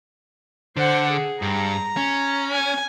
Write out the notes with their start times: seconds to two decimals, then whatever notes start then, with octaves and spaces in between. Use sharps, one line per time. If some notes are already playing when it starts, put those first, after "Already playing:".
0.77 D3 C5 F#5
1.10 G#4
1.42 G2 A#5
1.97 C#4
2.51 G#5